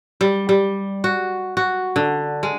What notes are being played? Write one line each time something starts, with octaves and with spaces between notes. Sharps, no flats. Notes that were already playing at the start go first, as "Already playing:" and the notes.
G3
G3
F#4
F#4
D3
G#3